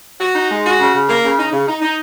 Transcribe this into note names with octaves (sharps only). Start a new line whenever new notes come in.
F#4
D#4
G#3
F#4
C#3
C#3
A#3
C#3
D#4
C#3
D#4
D#4